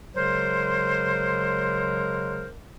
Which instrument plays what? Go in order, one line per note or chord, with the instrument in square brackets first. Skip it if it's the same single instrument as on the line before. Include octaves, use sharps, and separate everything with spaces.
[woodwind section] C#3 F#3 G#3 A#4 C5